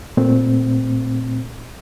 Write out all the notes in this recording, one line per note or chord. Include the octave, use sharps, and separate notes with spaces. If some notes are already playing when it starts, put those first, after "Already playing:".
A#2 A3 C4